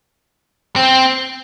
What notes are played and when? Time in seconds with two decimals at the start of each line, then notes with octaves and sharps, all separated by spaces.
0.76 C4